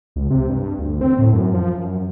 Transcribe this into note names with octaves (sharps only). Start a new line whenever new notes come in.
C#2
C3
G2
D2
C4
A2
F#2
F3
F#2